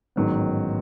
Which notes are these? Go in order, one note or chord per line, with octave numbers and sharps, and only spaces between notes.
A1 G#2 D#3 F#3 B3